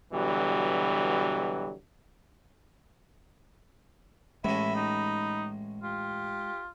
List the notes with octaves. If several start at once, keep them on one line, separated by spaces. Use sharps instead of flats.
B2 D3 E3 F#3 G3
A1 A2 G#3 E5 B5
D#4
F4 G4